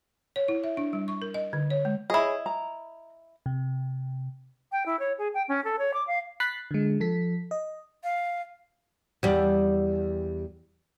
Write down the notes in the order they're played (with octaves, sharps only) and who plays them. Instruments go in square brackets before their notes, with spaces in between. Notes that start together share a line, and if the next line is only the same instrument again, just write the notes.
[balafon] C#5
E4
E5
D4
G3
C#6
A#4
D#5
D3
C#5
G#3
[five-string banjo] E4 D#5 [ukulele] G#4 C#5
[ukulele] A#5
[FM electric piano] C3
[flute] G5
E4
C#5
G#4
G5
C#4
A4
C#5
D6
F5
[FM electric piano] B5 F#6 A6 B6 C7
D3 G#3
F3 A4 B6
D#5
[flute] F5
[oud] E2 G3